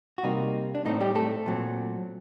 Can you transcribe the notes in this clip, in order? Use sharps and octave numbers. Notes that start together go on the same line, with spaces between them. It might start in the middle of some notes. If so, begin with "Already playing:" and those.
F#4
C3 G3 A#3 D#4
D4
A2 A3 C4 D#4
G3 G4
A3 A4
A#2 F#3 C4